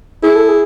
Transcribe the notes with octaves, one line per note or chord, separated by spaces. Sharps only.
E4 G#4
A4
G#4